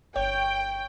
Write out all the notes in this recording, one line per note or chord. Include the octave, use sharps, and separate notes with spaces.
G1 C#5 G5